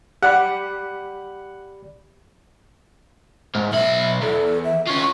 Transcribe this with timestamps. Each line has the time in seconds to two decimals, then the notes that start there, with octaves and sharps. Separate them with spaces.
0.23 G4 D5 F#5 B5
3.55 G#2
3.73 B1 E5 B5
4.22 E2 A4
4.64 E5
4.87 C#4 F4 C#6